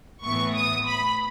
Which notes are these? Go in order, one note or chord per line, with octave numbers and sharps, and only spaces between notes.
A2 E3 B3 C#6
D#6
B5